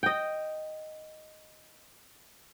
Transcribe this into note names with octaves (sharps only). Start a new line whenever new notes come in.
D#5 G5